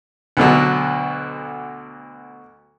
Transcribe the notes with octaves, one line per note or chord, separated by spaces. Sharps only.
D2 B2 D3 F#3